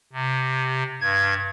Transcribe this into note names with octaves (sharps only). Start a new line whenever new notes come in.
C3
G2 G#6